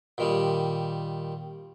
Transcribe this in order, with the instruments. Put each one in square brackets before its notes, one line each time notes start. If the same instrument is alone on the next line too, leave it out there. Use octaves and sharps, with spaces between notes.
[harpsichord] A#2 D#3 G3